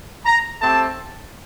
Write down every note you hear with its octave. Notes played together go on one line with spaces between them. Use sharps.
A#5
A3 C4 G4 A5